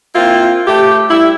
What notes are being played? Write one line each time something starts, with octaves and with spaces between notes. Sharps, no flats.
A#3 C4 E4 F4
A3 G4
G3 E4